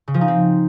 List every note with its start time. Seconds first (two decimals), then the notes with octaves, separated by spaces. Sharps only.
0.08 C#3
0.14 F3
0.21 D#4
0.28 C4